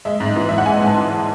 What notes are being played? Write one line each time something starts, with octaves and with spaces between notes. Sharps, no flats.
G#3 E5
G#2
E3
G#2 E5
F#5
G#3 G#5
C6
G#2 A5
E3